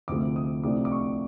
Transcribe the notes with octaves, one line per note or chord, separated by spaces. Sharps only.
D2 C3 F3 A3 D6
D#6
C2 C3 F3 A3 D4 D6
D6
C#6